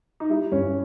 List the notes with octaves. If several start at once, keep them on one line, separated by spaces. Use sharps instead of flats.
D#4
G3 E4
G2 C#4